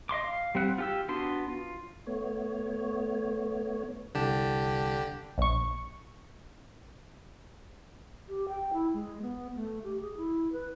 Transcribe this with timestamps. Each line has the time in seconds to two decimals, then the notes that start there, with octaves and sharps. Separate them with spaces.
0.09 D#5 E5 C6 D6
0.23 F5
0.55 G3 C4 F#5
0.78 F4 G4 E6
1.09 B3 D4 F#4 C6
1.48 F4
2.07 A3 B3 C#5
4.15 C2 D3 G4 A5
5.38 A#1 C#6
8.29 G4
8.48 G5
8.73 E4
8.94 G#3
9.22 B3
9.56 A3
9.84 G4
10.01 G#4
10.17 E4
10.52 B4